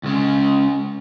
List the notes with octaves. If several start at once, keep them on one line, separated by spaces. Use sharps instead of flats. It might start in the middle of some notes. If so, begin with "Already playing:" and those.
C#2 C#3